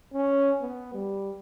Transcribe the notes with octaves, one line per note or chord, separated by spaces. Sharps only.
C#4
B3
G3